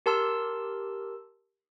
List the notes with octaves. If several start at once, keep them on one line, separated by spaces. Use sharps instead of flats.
G4 A#4 A5 C6 E6